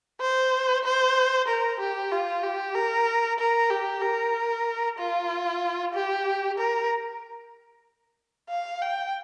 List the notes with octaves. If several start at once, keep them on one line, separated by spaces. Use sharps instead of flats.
C5
C5
A#4
G4
F4
G4
A#4
A#4
G4
A#4
F4
G4
A#4
F5
G5